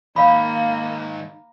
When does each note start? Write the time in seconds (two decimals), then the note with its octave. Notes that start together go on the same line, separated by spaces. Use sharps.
0.16 G#2 D#3 A#3 F5 B5